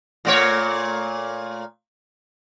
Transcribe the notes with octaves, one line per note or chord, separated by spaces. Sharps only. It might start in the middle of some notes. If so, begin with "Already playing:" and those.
A#2 A3 C#5